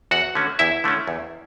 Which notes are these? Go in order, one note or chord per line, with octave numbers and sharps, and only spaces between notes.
E2 F#4 F#5
D3 A3 C#4
E2 E4 E5
D3 A3 C#4
E2